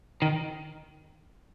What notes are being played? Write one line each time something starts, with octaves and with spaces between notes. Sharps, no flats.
D#3